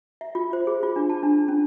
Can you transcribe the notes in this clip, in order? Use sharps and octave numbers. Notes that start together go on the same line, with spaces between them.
E5
F4
C5
G#4
F4
D4
A5
D4
C#4